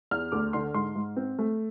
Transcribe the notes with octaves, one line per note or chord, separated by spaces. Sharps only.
E2 F6
D2 D6
D3 C6
G#2 C6
G#2
C4
A3